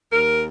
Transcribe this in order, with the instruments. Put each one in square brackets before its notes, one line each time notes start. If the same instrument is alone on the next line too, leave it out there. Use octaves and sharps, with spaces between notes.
[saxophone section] D#2 A#4